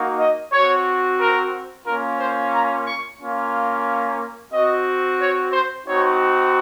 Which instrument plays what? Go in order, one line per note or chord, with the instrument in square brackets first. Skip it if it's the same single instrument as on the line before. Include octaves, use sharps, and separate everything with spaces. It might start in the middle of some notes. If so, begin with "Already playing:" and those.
Already playing: [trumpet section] A#3 D#4 F#4
D#5
C4 F#4 C#5
A#4
A#3 C#4 F4 A#4
C5
A#5
C#6
A#3 C#4 F4
C4 F#4 D#5
C#5
C5
C4 D#4 F#4 C#5